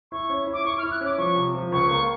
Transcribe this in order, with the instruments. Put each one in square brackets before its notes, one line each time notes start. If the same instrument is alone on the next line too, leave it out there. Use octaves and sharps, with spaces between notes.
[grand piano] E4 [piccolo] C#6
[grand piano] C#4
E4
[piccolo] D6
[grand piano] E4 [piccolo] C#6
[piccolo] F6
[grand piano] E4
[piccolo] F#6
[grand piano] C#4 [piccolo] D6
[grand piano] F3 [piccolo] C#6
[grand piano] C3
F3
[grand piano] C#2 [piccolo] C#6
[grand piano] A#3